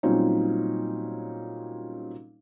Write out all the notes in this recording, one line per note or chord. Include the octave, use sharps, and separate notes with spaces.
A#2 F#3 G3 C4 C#4 D#4